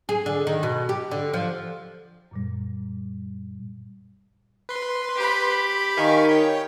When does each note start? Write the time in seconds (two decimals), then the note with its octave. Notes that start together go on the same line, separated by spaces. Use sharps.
0.09 G#4
0.26 D3
0.47 D#3
0.63 B2
0.89 G4
1.11 D3
1.34 F3
2.31 F#2 A#2 G3
4.69 B4 C6
5.16 G4 B5
5.97 D#3 F5 G#5 C#6
6.29 C#5 G5